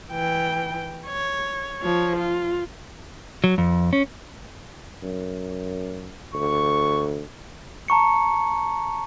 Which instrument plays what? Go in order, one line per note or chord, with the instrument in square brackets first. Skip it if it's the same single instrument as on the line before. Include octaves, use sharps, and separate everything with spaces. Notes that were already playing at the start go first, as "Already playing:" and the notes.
[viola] E3 G5
C#5
F3 C#5
F4
[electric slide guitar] F#3
F2
C#4
[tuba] F#2
[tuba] D2 [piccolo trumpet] C#6
[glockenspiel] A5 A#5 C#6 C#7